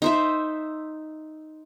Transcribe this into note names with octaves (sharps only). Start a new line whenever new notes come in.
D#4 C5 E5